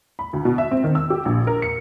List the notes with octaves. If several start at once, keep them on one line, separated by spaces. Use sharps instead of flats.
B5
D2
B2
E5
C4
D#3
E6
G4
A#1
A#4
C#7